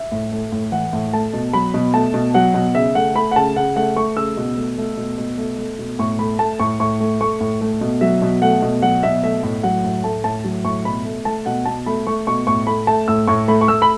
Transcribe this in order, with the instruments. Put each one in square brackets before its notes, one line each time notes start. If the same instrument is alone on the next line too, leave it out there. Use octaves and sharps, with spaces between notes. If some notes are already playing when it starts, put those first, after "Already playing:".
Already playing: [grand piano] E5
A2
A3
A2
E3 F#5
A2
A3 A5
B2
F#3 B5
B2
A3 A5
B2
F#3 F#5
B2
C#3 E5
A3 F#5
A3 B5
F#5
C#3 A5
C#3 F#5
A3 F#5
A3 C#6
C#3 E6
B2
A3
A3
B2
B2
A3
A3
B2
A2 C#6
A3 B5
A3 A5
A2 C#6
A2 C#6
A3
A3 C#6
A2
A3
B2
F#3 E5
B2
A3 F#5
B2
F#3 F#5
B2 E5
A3 E5
A2
F#3 F#5
A2
A3 A5
A2 A5
F#3
A2 C#6
B2 B5
A3
A3 A5
B2 F#5
B2 A5
A3 B5
A3 C#6
B2 C#6
A2 C#6
A3 B5
A3 A5
A2 E6
A2 C#6
A3 B5
C#6
A3 E6
B5